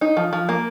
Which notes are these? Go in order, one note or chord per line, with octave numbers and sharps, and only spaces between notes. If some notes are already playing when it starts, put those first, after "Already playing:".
D#4
F3
F3
A#3